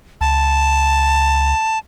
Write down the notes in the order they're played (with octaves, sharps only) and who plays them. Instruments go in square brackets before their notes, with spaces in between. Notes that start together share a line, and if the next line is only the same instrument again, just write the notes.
[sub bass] C#2 [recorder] A5